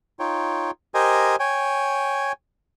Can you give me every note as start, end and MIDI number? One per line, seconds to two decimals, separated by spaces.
0.19 0.71 63
0.19 0.71 65
0.19 0.71 73
0.19 0.71 79
0.94 1.36 67
0.94 1.36 70
0.94 1.36 72
0.94 1.36 75
0.94 1.36 80
1.40 2.32 73
1.40 2.32 79
1.40 2.32 80